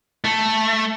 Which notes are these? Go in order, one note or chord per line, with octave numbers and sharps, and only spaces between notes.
A3